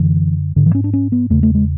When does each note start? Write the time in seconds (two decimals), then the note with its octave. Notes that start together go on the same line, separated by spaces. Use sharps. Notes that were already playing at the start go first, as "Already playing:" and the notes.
Already playing: F#2 D3 E3
0.56 G#2 D3
0.66 E3
0.75 C#4
0.84 D4
0.93 C#4
1.12 B3
1.30 E2 C#3 A3
1.43 A3
1.55 G#3